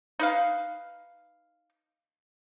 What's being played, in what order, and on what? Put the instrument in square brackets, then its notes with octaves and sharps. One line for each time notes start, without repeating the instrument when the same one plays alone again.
[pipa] D#4 B4 F5